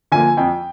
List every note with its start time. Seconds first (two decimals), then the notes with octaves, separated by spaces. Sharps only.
0.12 D3 F3 A#3 G#5
0.37 F2 G5